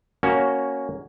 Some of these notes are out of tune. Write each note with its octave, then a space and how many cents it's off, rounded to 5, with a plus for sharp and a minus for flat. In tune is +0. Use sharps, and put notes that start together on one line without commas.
A#3 +0 C#4 +5 F#4 +10